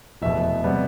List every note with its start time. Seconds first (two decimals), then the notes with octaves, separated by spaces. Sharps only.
0.22 F1 E2 B2 E5
0.64 C3 G3 B3